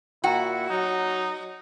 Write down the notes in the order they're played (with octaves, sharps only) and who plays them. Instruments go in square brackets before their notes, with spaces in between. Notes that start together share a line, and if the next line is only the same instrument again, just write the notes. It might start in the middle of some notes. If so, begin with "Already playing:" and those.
[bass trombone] A#2 [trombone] E4 [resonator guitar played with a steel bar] F#4 [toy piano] G5 A#5
[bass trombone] F#3 [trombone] D#4